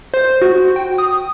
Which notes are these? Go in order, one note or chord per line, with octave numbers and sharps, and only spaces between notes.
C5
F#4
G5
D#6